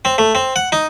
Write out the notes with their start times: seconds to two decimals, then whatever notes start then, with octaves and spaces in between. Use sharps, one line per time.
0.05 C4
0.18 A3
0.35 C4
0.56 F#5
0.72 D#4